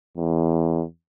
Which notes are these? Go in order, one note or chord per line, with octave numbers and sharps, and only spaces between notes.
E2